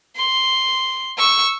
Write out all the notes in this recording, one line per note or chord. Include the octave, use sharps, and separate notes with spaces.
C6
C#6 E6